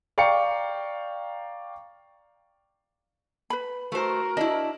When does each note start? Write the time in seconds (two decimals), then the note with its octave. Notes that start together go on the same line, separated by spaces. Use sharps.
0.18 D5 F5 G5 A#5 C#6 C#7
3.50 B4 B5
3.92 A3 F#4 A#4 C5
4.37 D4 E4 D#5